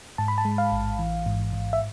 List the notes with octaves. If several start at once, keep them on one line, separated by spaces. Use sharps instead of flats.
G#2 A5
B5
A5
G#3
F5
A1
E3
G#2
G#2
E5